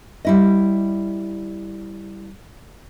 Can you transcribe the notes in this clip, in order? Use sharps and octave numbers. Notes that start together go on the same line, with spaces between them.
G3 E4 D#5